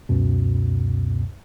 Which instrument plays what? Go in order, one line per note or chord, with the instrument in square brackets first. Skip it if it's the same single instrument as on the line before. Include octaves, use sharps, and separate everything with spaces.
[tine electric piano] C#2 F#2 B2